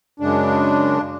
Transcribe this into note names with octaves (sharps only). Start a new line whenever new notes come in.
F#2 C#3 G#3 D4